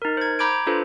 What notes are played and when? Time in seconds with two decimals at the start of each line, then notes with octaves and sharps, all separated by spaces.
0.02 D#4 A#4
0.17 C5 G#6
0.39 A#5 B5 D6 G6 G#6 D7
0.67 D4 F4 A4 B4 C5